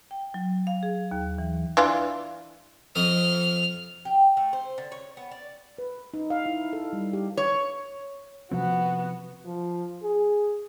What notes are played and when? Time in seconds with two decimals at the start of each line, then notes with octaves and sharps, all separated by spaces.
0.11 G5
0.34 F#3
0.67 F5
0.83 G#4
1.11 D#2
1.38 E3
1.77 E3 D4 F4
2.96 F2 D#5 F6
4.05 G4
4.37 A3
4.53 C5
4.78 D3
4.92 C#5
5.17 B3
5.31 D5
5.78 B4
6.14 D#4
6.30 F5
6.46 E4
6.73 A4
6.93 G3
7.13 G4
7.37 C#5
8.51 C3 F3 B3 C4 F#4
9.45 F3
10.03 G#4